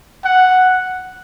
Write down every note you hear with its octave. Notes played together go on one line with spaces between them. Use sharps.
F#5